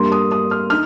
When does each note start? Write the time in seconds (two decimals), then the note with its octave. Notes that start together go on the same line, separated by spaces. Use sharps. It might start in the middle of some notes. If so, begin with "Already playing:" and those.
Already playing: G2 G3 A#3 C6
0.12 D#6
0.32 D#6
0.51 F6
0.70 D#4 F6